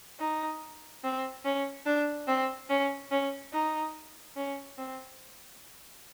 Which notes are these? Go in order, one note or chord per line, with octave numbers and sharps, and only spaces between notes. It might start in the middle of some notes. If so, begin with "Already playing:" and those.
D#4
C4
C#4
D4
C4
C#4
C#4
D#4
C#4
C4